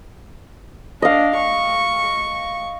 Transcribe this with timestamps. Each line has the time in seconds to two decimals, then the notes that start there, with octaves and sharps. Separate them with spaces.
1.02 D4 D#5 F5
1.37 C#6